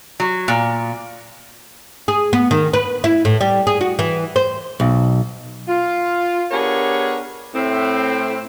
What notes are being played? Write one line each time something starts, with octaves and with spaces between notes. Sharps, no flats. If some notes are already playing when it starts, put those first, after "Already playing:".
F#3
A#2
G#4
B3
D#3
B4
E4
A2
G3
G#4
F#4
E3
C5
B1
F4
B3 D4 G4 G#4 A#4 C#5
A2 C4